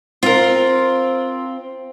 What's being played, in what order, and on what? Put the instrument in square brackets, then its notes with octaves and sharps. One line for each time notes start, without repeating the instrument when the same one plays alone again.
[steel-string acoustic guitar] C4 [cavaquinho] F4 A#4